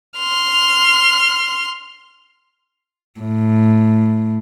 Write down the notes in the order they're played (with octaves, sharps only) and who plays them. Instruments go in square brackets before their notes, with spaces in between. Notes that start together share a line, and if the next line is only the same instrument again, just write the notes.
[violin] C6 F6
[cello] A2